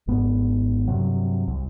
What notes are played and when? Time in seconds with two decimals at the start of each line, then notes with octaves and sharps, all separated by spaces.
0.08 G#1 G#2 B3
0.88 G2 C3 F#3
1.47 C2